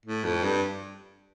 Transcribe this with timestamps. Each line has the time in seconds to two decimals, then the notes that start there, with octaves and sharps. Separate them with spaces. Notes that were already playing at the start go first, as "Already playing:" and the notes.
0.06 A2
0.25 F2
0.43 G2